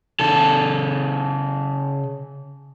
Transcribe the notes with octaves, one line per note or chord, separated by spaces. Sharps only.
C#3 A4